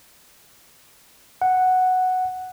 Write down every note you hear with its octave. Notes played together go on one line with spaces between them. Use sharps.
F#5